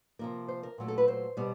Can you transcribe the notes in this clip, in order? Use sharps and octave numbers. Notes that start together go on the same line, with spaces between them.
C3 F3 A#3 A#4
C5
A#4
A#2 F#3 A3
A4
B4
C5
B2 G3 B3